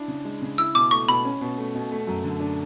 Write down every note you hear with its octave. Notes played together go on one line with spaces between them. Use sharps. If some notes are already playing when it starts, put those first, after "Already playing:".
Already playing: D4 E4
C#3
G#3
C#3
E4 E6
B2 D6
A3 C#6
B2 B5
C#4
B2
A3
B2
A3
F#2
D3
D4